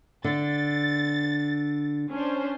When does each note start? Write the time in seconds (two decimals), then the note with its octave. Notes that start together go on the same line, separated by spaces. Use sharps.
0.24 D3 A6
2.10 C#4 D4 C5